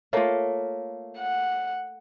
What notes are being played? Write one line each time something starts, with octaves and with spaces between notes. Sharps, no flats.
A3 A#3 F4 C#5
F#5